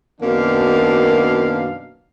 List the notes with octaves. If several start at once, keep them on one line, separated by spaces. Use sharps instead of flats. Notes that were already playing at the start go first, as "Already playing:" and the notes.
F#2 B2 D#3 A#3 D4 F5